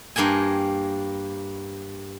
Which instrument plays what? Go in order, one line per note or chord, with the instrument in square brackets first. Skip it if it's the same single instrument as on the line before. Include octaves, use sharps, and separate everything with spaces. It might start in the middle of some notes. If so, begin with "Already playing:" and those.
[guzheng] G2 A#3 G5 G#5